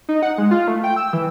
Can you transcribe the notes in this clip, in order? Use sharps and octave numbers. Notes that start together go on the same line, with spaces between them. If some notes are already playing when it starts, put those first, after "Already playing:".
D#4
F#5
G#3
F4
A3
G5
E6
E3